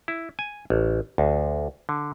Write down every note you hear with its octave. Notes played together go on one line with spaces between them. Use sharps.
E4
G#5
A1
D2
D3